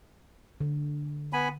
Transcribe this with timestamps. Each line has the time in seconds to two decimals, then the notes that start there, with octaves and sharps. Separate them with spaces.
0.60 D3
1.33 B3 G#5 B5